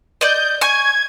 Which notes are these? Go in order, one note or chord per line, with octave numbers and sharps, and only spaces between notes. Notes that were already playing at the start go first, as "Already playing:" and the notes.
D5 D#5 G6
G#5 C#6 G#6